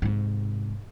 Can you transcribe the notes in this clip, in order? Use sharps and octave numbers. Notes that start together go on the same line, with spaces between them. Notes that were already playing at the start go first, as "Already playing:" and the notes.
G#2 C3